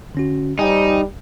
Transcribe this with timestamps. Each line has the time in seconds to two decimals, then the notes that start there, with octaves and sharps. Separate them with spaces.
0.15 D3 C#4 F#4
0.59 G3 D#4 C5 G5 G#5